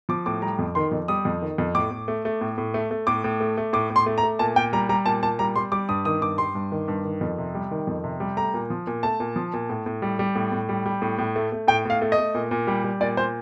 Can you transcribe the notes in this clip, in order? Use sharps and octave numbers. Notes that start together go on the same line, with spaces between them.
F3 D6
A2 D6
G3 A#5
F2
D#3 C6
F2
G3 D#6
F2
D#3
F2
A2 D6
A2
A3
A3
A2
A2
A3
A3
A2 D6
A2
A3
A3
A2 D6
A2
C6
A3
A#5
A3
A#2 A5
A#2 G5
G3 A#5
G3 A#5
A#2 A5
A#2 A5
G3 A#5
G3 C6
G3 D6
G2 D#6
D#3 D#6
G2 D6
G3 C6
G2
D#3
G2
D#3
F2
C3
G3
D#3
F2
C3
G3
A3 A#5
A#2
F3
A#2
A3 A5
A#2
F3
A#2
A2
A2
G3
G3
A2
A2
G3
G3
A2
A2
A3
A3
A2 G5
A2 F5
A3
D#5
A3
A#2
A#2
G3
G3
A#2 D5
A#2 C5